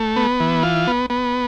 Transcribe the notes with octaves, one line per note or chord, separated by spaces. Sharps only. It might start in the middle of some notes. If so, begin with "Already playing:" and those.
Already playing: A3
B3
E3
F4
B3
B3